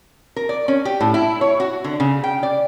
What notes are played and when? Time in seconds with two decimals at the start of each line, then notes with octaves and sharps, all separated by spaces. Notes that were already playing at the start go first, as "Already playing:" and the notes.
0.36 A#4
0.49 D5
0.68 C#4
0.85 G4
1.01 A2
1.14 E4
1.41 C#5
1.60 F#4
1.84 D3
2.00 C#3
2.24 G5
2.43 D5